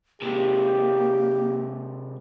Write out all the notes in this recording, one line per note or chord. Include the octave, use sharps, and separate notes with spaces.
C3 G#3 A#3 G4